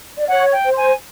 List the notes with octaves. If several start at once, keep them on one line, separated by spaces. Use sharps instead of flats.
D5
C#5 F#5
G5
C5
G#5